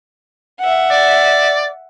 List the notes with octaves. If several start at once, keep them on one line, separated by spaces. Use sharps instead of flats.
E5 F#5
D5